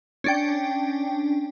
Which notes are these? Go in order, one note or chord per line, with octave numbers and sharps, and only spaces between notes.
C#4 D4 G5